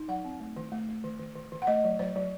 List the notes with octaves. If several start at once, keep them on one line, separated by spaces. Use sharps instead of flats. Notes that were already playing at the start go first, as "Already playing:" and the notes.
Already playing: D#4
F#3 F#5
C4
A3
D#3
A3
A3
D#3
D#3
D#3
D#3
F#5
A3 D#5
F#3
F#3 C5
F#3